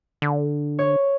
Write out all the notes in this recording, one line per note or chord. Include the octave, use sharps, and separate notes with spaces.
D3
C#5